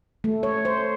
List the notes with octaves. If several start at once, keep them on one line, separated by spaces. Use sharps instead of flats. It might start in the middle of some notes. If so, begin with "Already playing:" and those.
A3
C#5
C5